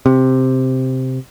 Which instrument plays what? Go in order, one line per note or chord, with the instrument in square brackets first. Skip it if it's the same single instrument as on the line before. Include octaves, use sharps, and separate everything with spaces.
[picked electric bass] C3